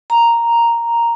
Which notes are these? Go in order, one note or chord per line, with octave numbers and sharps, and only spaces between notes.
A#5